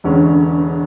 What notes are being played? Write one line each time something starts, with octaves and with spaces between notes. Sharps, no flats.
E1 E2 D3 G#3 C#4